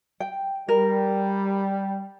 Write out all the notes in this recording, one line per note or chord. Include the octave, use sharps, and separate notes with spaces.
G5
G3 A#4